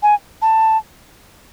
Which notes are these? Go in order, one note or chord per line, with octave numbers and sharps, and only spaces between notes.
G#5
A5